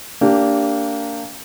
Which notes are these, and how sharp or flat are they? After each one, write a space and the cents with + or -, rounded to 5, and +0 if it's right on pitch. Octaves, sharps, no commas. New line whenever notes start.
A#3 -20 D4 -20 G4 +0